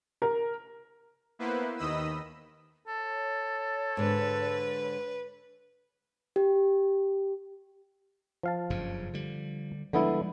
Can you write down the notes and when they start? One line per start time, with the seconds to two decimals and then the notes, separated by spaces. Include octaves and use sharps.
0.22 A#4
1.39 A#3 B3 E4 B4 C5
1.77 D#2 D#3 D#5 B5 D#6 E6
2.87 A4 C#5
3.97 G#2 D3 B4
6.36 G4
8.43 F3 F5 A5
8.70 F#1 G2 C#3
9.13 D3 G3
9.93 D3 F3 G3 G#3 B3 E4